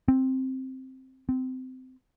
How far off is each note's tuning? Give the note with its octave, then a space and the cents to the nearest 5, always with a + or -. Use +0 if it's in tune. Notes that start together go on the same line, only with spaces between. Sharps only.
C4 +5
C4 -20